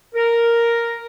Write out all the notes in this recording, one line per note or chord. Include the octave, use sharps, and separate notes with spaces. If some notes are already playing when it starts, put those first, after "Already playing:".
A#4